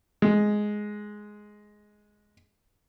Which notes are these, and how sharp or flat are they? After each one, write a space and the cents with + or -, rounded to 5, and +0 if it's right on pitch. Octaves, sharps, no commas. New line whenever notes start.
G#3 +5